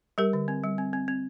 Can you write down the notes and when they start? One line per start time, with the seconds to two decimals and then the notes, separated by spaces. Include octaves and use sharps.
0.18 G3 G4 A#4
0.33 D3
0.48 C4
0.64 G3
0.78 C4
0.93 C4
1.08 C4